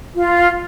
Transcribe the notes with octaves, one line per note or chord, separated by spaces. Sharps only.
F4